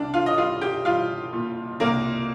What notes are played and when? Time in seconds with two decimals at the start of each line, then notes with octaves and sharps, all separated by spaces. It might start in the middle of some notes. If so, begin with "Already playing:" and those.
Already playing: C2 D4 D5
0.14 F4 F5
0.26 D#5
0.38 G3 F4 F5
0.61 G4 G5
0.85 G3 F4 F5
1.33 A#2
1.80 C2 A#3 A#4